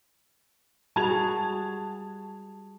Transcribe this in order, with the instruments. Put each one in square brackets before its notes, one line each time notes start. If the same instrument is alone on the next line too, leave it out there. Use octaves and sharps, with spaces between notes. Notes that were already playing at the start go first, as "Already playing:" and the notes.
[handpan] G3 F#4 G#4 [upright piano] A5 G#6 F7